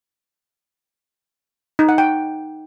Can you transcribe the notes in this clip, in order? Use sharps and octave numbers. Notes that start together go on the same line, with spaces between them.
D#4
F#5
G5